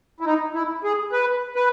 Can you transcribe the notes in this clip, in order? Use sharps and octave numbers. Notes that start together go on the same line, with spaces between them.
E4
D#4
E4
G#4
B4
B4